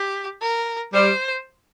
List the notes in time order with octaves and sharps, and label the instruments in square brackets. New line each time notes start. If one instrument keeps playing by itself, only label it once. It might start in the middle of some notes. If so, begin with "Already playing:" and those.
Already playing: [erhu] G4
A#4
[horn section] G3 [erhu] C5